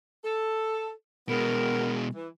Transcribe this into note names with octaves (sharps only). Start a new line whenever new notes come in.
A4
B2 G#3 B3 A#4
E3